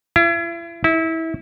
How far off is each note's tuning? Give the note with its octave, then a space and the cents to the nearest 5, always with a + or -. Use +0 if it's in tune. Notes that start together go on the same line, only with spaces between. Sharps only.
E4 +40
E4 -25